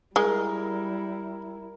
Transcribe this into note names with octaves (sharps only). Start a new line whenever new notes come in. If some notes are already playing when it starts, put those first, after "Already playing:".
G3 G#3 E4 A#4